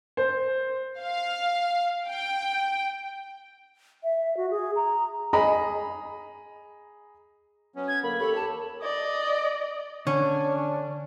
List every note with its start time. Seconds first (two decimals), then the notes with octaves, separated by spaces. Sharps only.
0.17 C5
1.01 F5
2.08 G5
4.03 E5
4.37 F#4
4.50 G#4
4.76 A#5
5.33 G#4 D#5 A#5 B5
7.76 F#3 B3 C#4
7.88 G#6
8.03 D3 A#3 B5
8.20 D#2 G4 A4 C#5 B5
8.35 A5
8.81 D5 D#5
10.07 D3 C#4 D4